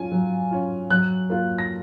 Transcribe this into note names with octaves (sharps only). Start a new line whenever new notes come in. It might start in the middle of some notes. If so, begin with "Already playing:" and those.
Already playing: F#3 C#4 F4 G#5
F#3
C#4 F4
F#3 F#6
A#3 F4
A#6